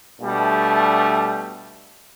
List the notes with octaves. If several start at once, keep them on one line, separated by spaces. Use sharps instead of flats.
B2 G3 A3 D4